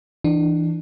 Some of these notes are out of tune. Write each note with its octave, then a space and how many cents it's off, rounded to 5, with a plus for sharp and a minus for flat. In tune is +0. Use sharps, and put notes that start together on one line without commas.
E3 +0 D4 +25